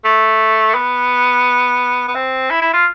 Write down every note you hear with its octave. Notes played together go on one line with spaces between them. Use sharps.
A3
B3
B3
C4
E4
E4
F4